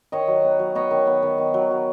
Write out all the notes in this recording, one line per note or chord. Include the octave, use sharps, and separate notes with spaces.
D#3 C#5 D#5
F#3
B3
F#3
B3 C#5 D#5
D#3
B3
D#3
D#3
F#3
F#3